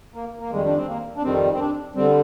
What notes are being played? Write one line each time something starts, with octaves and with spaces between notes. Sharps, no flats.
A#3
A#3
F2 D#3 G3 G#3
D4
C4
A#3
D4
F2 D#3 G3 C4
C4
D4
D3 G3 C4